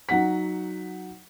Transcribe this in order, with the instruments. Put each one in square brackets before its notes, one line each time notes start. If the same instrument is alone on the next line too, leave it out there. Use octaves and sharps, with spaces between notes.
[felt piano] F#3 D#4 F#5 B6